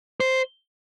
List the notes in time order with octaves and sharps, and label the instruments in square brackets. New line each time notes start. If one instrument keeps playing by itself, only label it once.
[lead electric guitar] C5